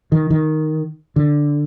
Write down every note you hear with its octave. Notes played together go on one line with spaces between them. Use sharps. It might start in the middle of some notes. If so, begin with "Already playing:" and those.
D#3
D#3
D3